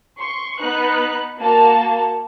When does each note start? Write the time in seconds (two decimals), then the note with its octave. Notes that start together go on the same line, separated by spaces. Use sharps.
0.18 C6 C#6
0.60 B3 D#4 B4 F#6
1.40 A#3 F#4 A5